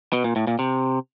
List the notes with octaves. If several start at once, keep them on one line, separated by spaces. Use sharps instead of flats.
B2
A#2
A2
A#2
C3